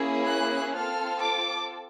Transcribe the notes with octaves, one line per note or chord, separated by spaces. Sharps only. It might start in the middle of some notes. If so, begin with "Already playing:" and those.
Already playing: A#3 C#4 E4 G#4
F#6
C4 F4 A4 F6
D6